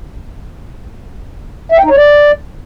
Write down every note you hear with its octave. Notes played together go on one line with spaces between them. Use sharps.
E5
G5
D#4
C#5
D5